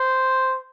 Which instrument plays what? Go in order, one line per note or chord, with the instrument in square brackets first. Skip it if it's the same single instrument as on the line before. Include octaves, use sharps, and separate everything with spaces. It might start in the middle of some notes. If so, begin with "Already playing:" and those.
Already playing: [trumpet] C5